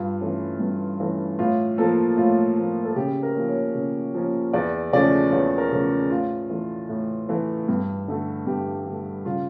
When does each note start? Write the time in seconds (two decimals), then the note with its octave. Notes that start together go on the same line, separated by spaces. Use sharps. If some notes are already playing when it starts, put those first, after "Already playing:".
Already playing: G2 F4
0.21 E3 A3 C#4
0.60 G2
1.00 E3 A3 C#4
1.39 A2 F4
1.78 F3 A#3 A4
2.17 A2 F4
2.57 F3 A#3
2.84 A4
2.96 C#3 G4
3.23 A#4
3.35 F3 A#3 C#4
3.49 C#5
3.75 C#3
4.14 F3 A#3 C#4
4.53 E2 D5
4.93 C#3 F3 A3 C#4 D5
5.32 E2 C#5
5.58 A#4
5.72 C#3 F3 A3 C#4
6.11 A2 F4
6.50 E3 A3
6.89 A2
7.29 E3 A3
7.68 G2
8.08 D3 A3
8.47 G2 G4
8.86 D3 A3
9.25 C#3 F4